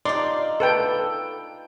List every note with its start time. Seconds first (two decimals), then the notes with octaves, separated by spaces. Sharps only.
0.05 D#4 F4 D5 C6
0.60 A4 B4 G5